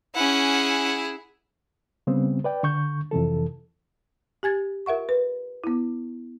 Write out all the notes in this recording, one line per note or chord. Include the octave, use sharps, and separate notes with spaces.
C#4 E4 G#4 F#5
C#3 G3 B3 C4
B4 D5 G5
D3 C#6 G6
F2 C3 E3 A4
G4 G#5 G#6 A6
F4 A#4 E5 F#5 C#6
B4
B3 E4